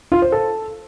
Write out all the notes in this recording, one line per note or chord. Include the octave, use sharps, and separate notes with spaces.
F4
C5
A4